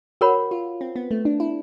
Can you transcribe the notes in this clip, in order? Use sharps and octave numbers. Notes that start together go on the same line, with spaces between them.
F#4 A#4 C#5 F#5 B5
F4
C4
B3
A3
D4
E4